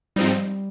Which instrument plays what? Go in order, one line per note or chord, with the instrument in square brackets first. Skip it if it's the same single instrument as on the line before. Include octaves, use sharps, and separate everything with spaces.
[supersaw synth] G#2 F3 C4 D#4 [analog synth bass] G3